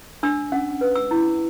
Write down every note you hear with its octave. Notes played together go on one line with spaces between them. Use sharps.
D4 E6
C#4 F#5
B4
E6
E4